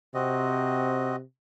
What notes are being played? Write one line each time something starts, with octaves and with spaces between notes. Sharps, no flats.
C3 C4 F#4 D#5